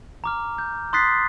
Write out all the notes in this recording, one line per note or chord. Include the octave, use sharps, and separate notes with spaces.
A#5 D6 F6
G6
C6 D#6 F#6 A6 B6 C7